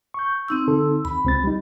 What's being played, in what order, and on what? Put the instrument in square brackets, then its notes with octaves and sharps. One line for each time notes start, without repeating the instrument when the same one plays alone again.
[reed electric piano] C#6 G6
[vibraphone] C4 D#4 E6
[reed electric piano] D3 A4
[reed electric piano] D#2 [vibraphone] B5
[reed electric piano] C#2 C4 A6
G3 D#4